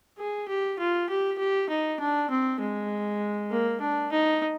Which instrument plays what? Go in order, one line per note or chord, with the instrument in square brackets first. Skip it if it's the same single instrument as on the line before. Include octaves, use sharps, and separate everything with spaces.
[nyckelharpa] G#4
G4
F4
G4
G4
D#4
D4
C4
G#3
A#3
D4
D#4